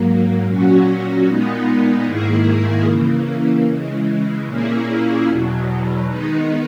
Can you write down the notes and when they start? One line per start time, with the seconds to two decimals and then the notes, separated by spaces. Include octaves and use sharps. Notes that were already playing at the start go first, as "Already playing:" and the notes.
Already playing: G#2 F#3 A#3
0.45 A#2 F#3 C#4 F#4
1.26 A#2 G#3 B3 D#4
2.06 G#2 D#3 A#3 E4 G#4
2.86 C#3 E3 A#3
3.66 C#3 E3 G#3
4.46 A#2 A#3 C#4 E4 G#4
5.27 E2 B2 F#3
6.06 D#3 G#3 B3 D#4